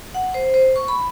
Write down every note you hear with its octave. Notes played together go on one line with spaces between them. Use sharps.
F#5
C5
C5
C#6
B5